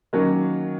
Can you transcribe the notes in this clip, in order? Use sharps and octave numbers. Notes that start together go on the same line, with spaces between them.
D#3 F#3 A#3 C#4